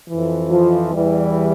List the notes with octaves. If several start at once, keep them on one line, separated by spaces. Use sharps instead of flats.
F2 E3
F3
E2 E3 G3